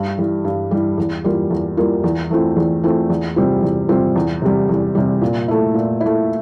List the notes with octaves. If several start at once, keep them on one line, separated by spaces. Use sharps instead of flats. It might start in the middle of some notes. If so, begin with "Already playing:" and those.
Already playing: G2
E3 G3
G2
E3 G3
E2
E3 G3 A#3 F4
E2
E3 G3 A#3 F4
E2
E3 A3 C4 F4
E2
E3 A3 C4 F4
E2
C3 G3 C4 F4
E2
C3 G3 C4 F4
E2
C3 G3
E2
C3 G3
A#2
A3 E4
A#2
E4
A3